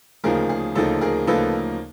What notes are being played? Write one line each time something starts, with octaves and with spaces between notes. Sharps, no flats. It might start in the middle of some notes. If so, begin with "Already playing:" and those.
D2 C#3 F3 A#3 D#4 G#4 A#4
G#4
D2 C#3 F3 A#3 D#4 A4
G#4 A#4
D2 C#3 F3 A#3 D#4 A4 B4